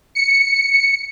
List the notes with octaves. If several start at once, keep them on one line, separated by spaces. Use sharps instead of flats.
C#7